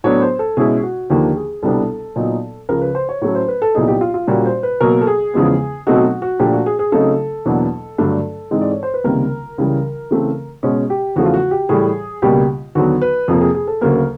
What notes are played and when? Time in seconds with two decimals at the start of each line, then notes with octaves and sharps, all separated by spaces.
0.04 A2 F#3 B3 D4 C#5
0.21 C5
0.39 A4
0.57 B2 G#3 C#4 E4 G#4
0.83 F#4
1.10 D#2 D3 F3 A#3 D4 G4
1.36 G#4
1.63 C2 B2 G3 B3 D4 A4
2.16 A#2 F#3 B3 D#4
2.69 C#2 C#3 F3 A#4
2.81 B4
2.95 C5
3.09 C#5
3.21 A2 F#3 A3 C#4 C#5
3.35 C5
3.48 B4
3.62 A4
3.75 C2 A#2 F#3 B3 D#4 G#4
3.88 G4
4.01 F4
4.14 F4
4.27 A#2 G3 A#3 C#4 F#4
4.46 C5
4.63 B4
4.81 B2 F#3 A#3 A#4
5.01 A4
5.07 G#4
5.34 E2 C#3 F3 G#3 B3
5.87 B2 F#3 A3 C4 D#4 F#4
6.04 F#4
6.22 F#4
6.39 A#2 F3 A3 D4 G4
6.53 F#4
6.66 G#4
6.79 G#4
6.92 C#3 F#3 A3 C4 D#4 A4
7.46 E2 B2 F#3 A#3 D4
7.98 G2 D3 F#3 A3 D4
8.51 G#2 E3 G#3 C4 D#4
8.61 D5
8.71 C#5
8.83 C5
8.94 B4
9.04 C#2 C3 D#3 G3 A#3 A#4
9.58 C#2 C#3 E3 G3
10.11 C#3 E3 A3 C4
10.63 B2 G#3 C#4
10.90 G4
11.16 E2 C#3 F3 A3 F#4
11.26 F4
11.34 F#4
11.51 G4
11.69 A2 E3 G3 G#4
12.22 C#2 B2 G3 A#3 G4
12.75 D#2 D3 F#3 B3 F#4
13.02 B4
13.28 F2 C3 F3 A#3
13.41 G#4
13.54 G#4
13.67 A4
13.81 D2 C#3 F#3 A#3 A#4